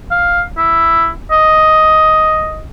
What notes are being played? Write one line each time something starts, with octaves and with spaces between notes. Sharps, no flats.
F5
E4
D#5